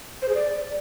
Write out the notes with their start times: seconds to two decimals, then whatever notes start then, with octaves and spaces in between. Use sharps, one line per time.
0.22 C5
0.28 G#4
0.35 D5